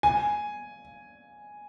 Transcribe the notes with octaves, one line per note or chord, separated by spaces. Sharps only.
G#5